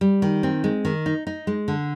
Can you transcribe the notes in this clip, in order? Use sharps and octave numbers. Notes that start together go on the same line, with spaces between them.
G3
D#3
C4
G#3
D#3
D#4
D#4
G#3
D3